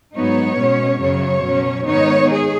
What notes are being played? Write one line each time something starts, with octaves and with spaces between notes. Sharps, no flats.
G#2 F#3 B3 D#4 C#5
B2 G#3 C#4
F#2 C#3 F#3 C#5
B2 F#3 C#4
G#2 D#3 B3 D#4 C#5
G#4